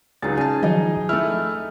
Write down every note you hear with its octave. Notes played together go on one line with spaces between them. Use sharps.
C#2 F#3 D#4 G#4 A6
C#4 G#5 A5
D#3 F3 F#3 D#4 D#5
A3 E4 F6